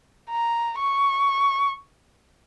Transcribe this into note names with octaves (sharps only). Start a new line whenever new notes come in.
A#5
C#6